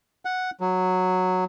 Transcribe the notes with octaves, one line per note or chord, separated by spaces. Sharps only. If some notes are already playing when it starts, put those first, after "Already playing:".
F#5
F#3